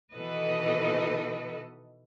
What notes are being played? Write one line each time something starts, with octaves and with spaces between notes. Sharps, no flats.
B2 D#3 E3 A4 B4 D#5